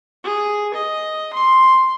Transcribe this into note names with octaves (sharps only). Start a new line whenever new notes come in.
G#4
D#5
C6